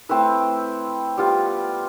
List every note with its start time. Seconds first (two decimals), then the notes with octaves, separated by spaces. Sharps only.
0.09 A3 C4 E4 B4
1.17 G3 B3 F4